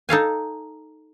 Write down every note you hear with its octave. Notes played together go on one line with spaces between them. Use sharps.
D#4 A4 F5 G#5